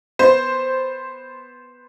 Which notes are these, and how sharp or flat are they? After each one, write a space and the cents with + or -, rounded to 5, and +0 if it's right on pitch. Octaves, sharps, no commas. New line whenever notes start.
B3 +0 C5 +0